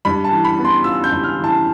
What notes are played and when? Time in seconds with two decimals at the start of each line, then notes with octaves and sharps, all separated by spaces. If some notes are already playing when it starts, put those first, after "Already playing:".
0.05 G2 B5
0.24 A5
0.31 E3
0.45 B5
0.58 B3
0.64 C6
0.84 F4 E6
1.04 G6
1.10 G2
1.24 F6
1.37 E3
1.44 A5